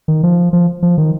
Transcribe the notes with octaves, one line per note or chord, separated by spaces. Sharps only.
D#3
F3
F3
F3
D#3